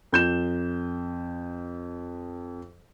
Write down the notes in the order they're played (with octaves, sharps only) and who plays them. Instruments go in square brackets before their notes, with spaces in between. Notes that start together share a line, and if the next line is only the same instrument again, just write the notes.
[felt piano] F2 G6 E7